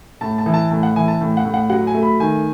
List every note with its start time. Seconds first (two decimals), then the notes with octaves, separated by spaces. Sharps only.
0.21 A2 A5
0.38 A5
0.46 E3
0.54 A5
0.71 A2 A5
0.83 F#5
0.96 E3 G#5
1.08 A5
1.21 A2
1.37 F#5
1.45 A2
1.54 F#5
1.70 F#3 F#5
1.87 G#5
1.94 A3
2.03 B5
2.20 D#3 G#5